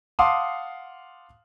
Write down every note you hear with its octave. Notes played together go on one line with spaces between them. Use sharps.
F5 F#5 A5 C6 D6 D#6